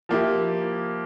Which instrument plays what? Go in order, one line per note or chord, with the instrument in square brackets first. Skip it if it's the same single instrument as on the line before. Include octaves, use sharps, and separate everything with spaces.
[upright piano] F3 A#3 E4 G4